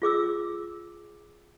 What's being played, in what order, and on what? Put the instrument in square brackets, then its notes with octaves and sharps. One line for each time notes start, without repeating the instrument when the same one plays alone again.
[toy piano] F4 G#4 D6 E6